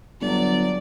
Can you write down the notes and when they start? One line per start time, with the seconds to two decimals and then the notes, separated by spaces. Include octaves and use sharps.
0.21 G1 F#3 D5